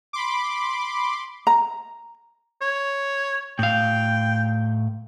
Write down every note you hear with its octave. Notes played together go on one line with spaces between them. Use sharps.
B5 C6 D6
A#5
C#5
A2 F5 G5